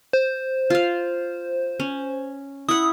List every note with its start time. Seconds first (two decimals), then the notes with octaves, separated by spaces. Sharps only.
0.13 C5
0.70 F4 F5
1.80 C#4
2.69 E4 F#5 D#6